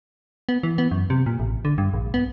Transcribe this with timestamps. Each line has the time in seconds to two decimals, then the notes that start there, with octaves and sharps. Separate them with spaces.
0.49 B3
0.63 E3
0.78 B3
0.91 F#2
1.10 C3
1.26 A#2
1.39 A1
1.65 D3
1.78 G2
1.94 A#1
2.14 B3